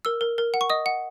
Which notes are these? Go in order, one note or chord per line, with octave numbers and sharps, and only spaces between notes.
A#4 E6
A#4
A#4
F#5
C#6
D#5 D#6
F#5